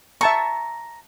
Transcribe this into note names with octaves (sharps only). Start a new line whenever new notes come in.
E5 A5 A#5 C#6